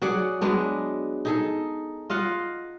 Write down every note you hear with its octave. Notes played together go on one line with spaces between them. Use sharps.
F#3 G#4 D5 F#5
F#3 G#3 B3 D4
D#4 G#4 A4
F4 D#5 F5 F#5